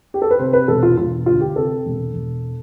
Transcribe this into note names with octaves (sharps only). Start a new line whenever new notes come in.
G4
A4
B4
C3 C5
B4
E1 A4
F4
E1 F4
D2 F4
G4
C3 A4
E1
E1